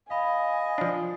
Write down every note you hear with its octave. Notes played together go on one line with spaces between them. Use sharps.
D#5 F5 G#5 B5
F3 D4